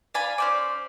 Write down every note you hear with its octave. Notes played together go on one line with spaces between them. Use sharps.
D5 F5 G#5 B5
C#4 C5 D5